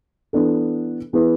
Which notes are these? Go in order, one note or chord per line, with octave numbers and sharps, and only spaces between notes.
E3 B3 D4 A4
E3 B3 E4 G#4 B4